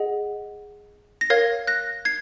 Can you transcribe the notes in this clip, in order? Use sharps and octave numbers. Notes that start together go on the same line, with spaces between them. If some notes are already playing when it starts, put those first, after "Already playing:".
Already playing: G#4 D#5 F#5
A#6
A#4 C#5 F5 G#6 C7
F#6 A#6
G#6 C7